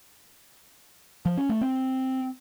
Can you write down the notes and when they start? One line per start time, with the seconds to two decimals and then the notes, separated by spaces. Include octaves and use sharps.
1.26 F3
1.37 C#4
1.49 A3
1.61 C4